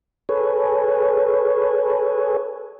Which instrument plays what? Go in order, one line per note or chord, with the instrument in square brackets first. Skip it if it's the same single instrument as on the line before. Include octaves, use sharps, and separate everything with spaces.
[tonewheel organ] G#4 A4 B4 C#5